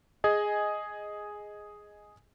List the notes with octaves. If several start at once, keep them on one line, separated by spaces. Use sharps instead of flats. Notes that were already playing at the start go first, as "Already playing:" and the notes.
G#4 D#5 G#5